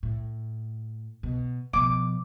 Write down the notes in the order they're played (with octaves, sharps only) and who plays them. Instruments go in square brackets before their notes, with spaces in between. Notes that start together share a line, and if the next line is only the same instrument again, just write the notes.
[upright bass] A2
B2
[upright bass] B2 F3 [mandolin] D6